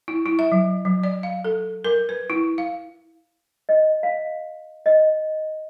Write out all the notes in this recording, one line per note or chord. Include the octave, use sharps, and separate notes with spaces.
E4
E4
E5
F#3
F#3
D5
F5
A4
A#4
B4
E4
F5
D#5
F5
D#5